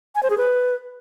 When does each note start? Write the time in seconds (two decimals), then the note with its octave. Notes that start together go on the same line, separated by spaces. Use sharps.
0.15 G#5
0.23 C5
0.30 G#4
0.38 B4